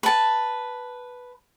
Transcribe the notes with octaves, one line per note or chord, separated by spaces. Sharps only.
B4 A5